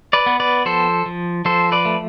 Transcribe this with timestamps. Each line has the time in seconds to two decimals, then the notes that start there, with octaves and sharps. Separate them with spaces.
0.13 B4 D5
0.26 B3
0.40 B4 D5
0.65 F3 A4 C5
1.06 F3
1.45 F3 A4 C5
1.72 B4 D5
1.85 A3